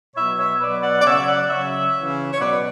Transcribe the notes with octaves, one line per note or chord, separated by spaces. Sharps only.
B2 F#3 C#5 E5
C#5 E5
B2 F#3 B4 D5
D5 F#5
D5
C#3 F#3 C#5 E5
D5 F#5
C#3 F#3 C#5 E5
C#3 E3
C#5
B2 F#3 B4 D5